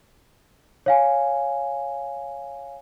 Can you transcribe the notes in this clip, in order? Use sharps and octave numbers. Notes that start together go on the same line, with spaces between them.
C#5 F5 G#5